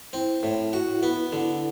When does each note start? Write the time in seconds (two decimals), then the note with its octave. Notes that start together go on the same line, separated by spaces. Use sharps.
0.13 C4 E4
0.43 A2
0.73 F#4
1.03 B3
1.32 D3